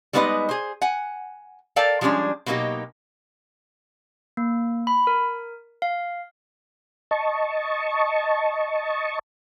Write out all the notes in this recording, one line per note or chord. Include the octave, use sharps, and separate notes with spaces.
G3 G#3 B3 D#4 B4 D#5
G#4 C5
F#5 G#5
A4 A#4 D5 F5 G5 A5
F3 G3 G#3 C#4 D4
B2 F#3 A#3 D4 D#4 G4
A#3
B5
A#4
F5
D#5 A5 C#6